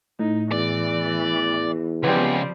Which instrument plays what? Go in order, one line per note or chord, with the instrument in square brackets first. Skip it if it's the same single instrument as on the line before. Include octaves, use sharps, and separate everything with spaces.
[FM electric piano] A2 [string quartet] D#4
[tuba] E2 [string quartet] E3 [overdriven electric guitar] D5
[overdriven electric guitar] C#2 [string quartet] F3 G3 C4 [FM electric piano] B3 G4